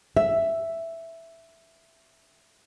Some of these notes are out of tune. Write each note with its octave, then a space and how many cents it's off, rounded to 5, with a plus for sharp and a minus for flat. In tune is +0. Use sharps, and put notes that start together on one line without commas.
E5 +5